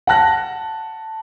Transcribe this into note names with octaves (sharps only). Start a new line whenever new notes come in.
F#5 G5 A5 F#6 A#6